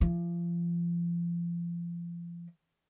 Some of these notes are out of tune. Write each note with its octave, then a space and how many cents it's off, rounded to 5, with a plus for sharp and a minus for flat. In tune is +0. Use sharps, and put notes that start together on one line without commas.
F3 -30